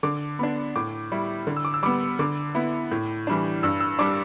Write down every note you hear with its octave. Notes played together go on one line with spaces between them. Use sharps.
D3 D6
B3 D4
A2 D6
G3 E4
D3
E6
D6
E6
G3 B3 D6
D3 D6
B3 E4
A2
E3 G3 D4
G2 E6
E6
G3 D4 D6